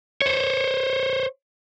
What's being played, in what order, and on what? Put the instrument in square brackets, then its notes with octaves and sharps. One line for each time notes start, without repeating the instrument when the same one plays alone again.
[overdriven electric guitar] C5 C#5